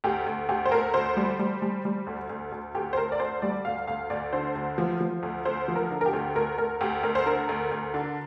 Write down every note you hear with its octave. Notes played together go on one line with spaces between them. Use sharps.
D2 G4
D2
D2 G4
C5
D2 A#4
D2 C5
G3
G3
G3
G3
D2
D2
D2
D2 G4
C5
D2 A#4
D5
D2 C5
G3 D5
D2 F5
D2 F5
D2 D5
D3 C5
D2
F3
F3
D2
D2 C5
F3
A#4
D3
A#4
G4
D2
D2 A#4
D2 A#4
D2 G4
D2 A#4
C5
D3 A#4
D2
D2
D3